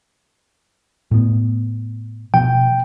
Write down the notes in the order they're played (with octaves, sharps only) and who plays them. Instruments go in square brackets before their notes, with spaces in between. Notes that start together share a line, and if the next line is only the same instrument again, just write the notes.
[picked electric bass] A2 B3
[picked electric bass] B2 F3 [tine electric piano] G5